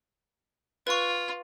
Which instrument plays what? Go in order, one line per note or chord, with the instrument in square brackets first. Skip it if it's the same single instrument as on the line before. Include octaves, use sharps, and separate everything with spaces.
[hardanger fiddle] F4 [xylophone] B4 C#6